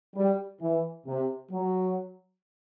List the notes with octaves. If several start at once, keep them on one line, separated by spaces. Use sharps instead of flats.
G3
E3
C3
F#3